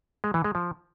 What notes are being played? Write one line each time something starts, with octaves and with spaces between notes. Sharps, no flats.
G#3
E3
G#3
F3